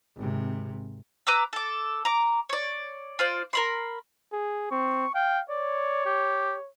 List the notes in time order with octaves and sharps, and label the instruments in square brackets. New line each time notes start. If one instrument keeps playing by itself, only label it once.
[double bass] G#1 C3
[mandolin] B4 A#5 D6 E6
A4 D6
A#5 D6
C#5 D5
F4 C5 D5
A#4 B5 C6
[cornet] G#4
[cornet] C4 [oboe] C#6
[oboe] F5 [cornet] G5
[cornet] C#5 [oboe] D5
[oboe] G4